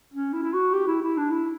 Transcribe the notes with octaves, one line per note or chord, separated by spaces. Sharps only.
C#4
E4
E4
F#4
G4
E4
E4
D4
E4